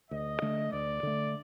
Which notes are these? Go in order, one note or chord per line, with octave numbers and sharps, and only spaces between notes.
D2 D#5
D3 A3
D2 D5
D3 A3